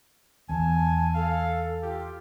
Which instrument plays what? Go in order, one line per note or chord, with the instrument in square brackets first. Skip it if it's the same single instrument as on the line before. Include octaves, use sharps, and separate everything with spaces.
[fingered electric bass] E2 [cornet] G#5 [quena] A5
[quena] A4 [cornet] F5
[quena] F4 [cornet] G4